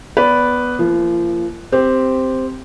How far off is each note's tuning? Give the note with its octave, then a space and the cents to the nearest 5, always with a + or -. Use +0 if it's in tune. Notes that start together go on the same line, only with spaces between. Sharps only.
B3 +0 B4 +0 D5 -20
F3 -35 A#3 -20
C4 -5 G4 +0